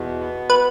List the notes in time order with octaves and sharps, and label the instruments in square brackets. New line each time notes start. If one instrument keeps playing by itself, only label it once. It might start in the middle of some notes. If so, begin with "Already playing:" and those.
Already playing: [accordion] E2 B2
B3
[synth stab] B4